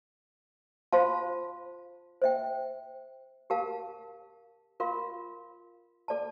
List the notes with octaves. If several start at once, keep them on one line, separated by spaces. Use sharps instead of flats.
F4 C5 F5 A5 C6
C5 E5 G5
G4 A#4 F5 A5
F4 A#4 F5 C6
A4 D5 A5